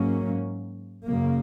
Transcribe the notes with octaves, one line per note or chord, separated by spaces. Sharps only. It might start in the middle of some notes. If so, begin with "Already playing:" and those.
Already playing: G#2 F#3 A#3 C#4
F#2 C#3 A#3